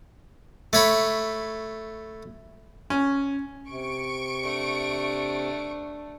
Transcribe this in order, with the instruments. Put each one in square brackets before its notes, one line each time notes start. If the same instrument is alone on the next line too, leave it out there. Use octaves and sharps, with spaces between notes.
[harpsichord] A3 C#5 B5
[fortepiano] C#4
[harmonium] C3 [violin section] C#6 D7
[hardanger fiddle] A3 D4